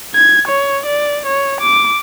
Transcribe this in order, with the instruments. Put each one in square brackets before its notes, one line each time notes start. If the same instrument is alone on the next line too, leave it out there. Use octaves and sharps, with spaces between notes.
[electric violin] G#6
C#5
D5
C#5
D6